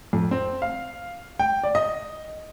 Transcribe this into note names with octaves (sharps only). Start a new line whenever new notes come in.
F2
C4
F5
G5
D5
D#5